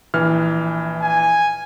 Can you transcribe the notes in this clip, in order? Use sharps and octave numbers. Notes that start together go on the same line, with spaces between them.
A#1 E3 F6
G#5